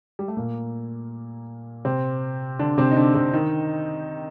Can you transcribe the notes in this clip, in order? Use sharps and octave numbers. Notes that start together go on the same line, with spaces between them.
G3
A3
A#2 A#3
C3 C4
D3 D4
C3 C4
D#4
D3 D4
C3 C4
D#3 D#4